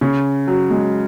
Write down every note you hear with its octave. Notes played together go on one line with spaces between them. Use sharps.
C#3
F#3
G#3